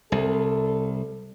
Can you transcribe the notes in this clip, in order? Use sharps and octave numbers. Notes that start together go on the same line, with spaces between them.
C2 A4